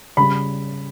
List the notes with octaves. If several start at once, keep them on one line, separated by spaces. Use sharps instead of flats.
C#3 G3 B5